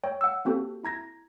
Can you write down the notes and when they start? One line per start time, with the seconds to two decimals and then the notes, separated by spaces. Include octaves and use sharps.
0.04 C#5 G5
0.21 F#5 E6
0.45 A#3 C4 F#4 G4 A4
0.83 E4 A#5 G#6 A#6